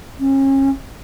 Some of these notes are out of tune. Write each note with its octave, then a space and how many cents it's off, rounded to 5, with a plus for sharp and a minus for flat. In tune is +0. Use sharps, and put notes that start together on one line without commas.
C#4 -35